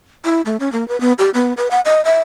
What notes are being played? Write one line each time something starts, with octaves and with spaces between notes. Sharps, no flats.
E4
A3
C#4
A#3
B4
B3
G4
B3
B4
F#5
D#5
E5